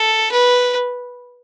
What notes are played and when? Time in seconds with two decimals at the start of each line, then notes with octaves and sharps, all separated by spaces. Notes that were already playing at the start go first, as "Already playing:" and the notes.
Already playing: A4
0.32 B4